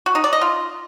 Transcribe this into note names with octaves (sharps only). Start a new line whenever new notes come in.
F#4
D#4
D5
D#5
F4